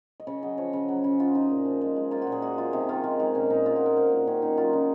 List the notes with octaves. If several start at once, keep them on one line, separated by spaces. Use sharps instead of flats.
D#5
C#3 C#5
F#3 D#5
F3 C#5
C#3
F#3
C#3
G#3 F4
G#3 D#4
A#2
F3
G#3
G#3
A#3 F4
F#4
A#2
G#4
G#3 F#4
G#3 F4
C3 D#4
D#3 F4
G#3 F4
G#3 D#4
A#2 C#4
A#2 D#4
A#3 F4
F#4
A#3 A#4
G#3 C5
A#4
A#2
D#3 C#4
D#3 D#4
F#3 F4
C#3 D#4